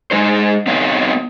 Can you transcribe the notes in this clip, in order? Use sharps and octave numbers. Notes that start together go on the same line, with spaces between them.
G#3 D#4 C5
B3 C4 D#4 C#5 F5